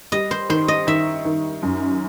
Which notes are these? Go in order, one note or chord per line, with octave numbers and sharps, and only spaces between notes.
G3 D#5
C5
D#3 C5
D#5
D#3 E5
D#3
F#2